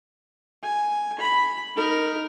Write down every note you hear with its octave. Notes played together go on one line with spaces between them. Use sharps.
G#5
B5
D#4 A#4